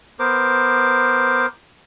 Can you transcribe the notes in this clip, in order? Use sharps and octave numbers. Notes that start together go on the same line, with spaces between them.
B3 A#4 C5 D6